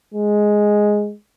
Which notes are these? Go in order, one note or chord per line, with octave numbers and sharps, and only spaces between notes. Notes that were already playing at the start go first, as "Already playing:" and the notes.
G#3